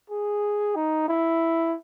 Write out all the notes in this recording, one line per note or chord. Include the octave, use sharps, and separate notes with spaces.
G#4
D#4
E4